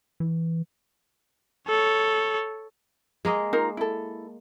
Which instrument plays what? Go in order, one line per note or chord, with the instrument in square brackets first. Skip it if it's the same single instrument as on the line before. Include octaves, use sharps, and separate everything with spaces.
[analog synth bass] E3
[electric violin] A4 C#5
[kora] G#3 A#3 D#5
[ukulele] D#4 F4 A#4
E4 A4